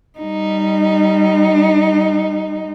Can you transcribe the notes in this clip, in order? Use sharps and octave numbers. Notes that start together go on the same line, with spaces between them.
G3 D#4